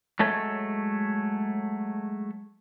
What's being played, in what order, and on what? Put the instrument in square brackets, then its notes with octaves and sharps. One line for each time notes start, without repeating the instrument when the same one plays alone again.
[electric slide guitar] F#3 G#3 A3 A4 C#5 E5